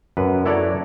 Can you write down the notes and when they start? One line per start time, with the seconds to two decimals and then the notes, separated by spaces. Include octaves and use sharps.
0.17 F#2 B4
0.46 E4 A4 C#5 D5 F#5 A#5